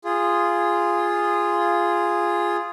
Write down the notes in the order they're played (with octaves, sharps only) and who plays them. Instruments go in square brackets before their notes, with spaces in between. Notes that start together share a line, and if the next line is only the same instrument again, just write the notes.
[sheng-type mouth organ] F4 G#4